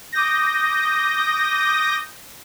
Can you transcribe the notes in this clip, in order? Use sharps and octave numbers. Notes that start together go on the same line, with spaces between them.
D6 D#6 G6 A#6